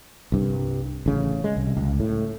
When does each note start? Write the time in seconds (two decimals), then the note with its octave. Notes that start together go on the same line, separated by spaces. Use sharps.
0.32 C2 G2
1.06 A1 C#3
1.44 G#3
1.57 C2
1.77 C#2
2.00 A2